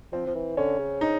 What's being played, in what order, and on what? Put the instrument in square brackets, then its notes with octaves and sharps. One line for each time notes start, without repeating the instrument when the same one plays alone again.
[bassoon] F3 [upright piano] C4
[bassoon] F3
E3
[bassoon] D3 [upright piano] C#4
[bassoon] C#3
[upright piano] D#4